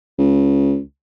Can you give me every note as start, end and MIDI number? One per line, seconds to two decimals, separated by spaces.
0.19 0.78 37